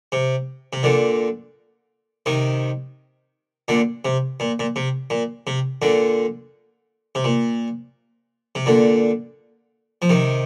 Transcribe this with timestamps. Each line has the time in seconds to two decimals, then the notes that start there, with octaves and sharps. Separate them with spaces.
0.12 C3
0.73 C3
0.83 A#2 D3
2.26 C3 D#3
3.68 A#2 D3
4.05 C3
4.40 A#2
4.59 A#2
4.76 C3
5.10 A#2
5.47 C3
5.82 A#2 D3
7.15 C3
7.24 A#2
8.55 C3
8.66 A#2 D3
10.02 F3
10.09 C3 D#3